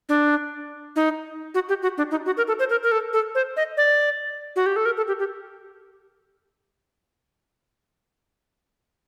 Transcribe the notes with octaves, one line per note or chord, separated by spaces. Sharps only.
D4
D#4
F#4
G4
F#4
D4
D#4
F#4
A#4
A4
C5
A#4
A#4
A4
A4
C5
D#5
D5
F#4
G4
A4
A#4
A4
G4
G4